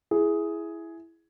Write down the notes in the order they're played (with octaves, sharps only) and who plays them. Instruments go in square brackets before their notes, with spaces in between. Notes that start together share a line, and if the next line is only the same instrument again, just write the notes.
[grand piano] E4 G#4